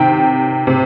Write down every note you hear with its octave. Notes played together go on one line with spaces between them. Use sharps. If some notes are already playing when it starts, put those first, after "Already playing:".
Already playing: C3 D#3 G5
C3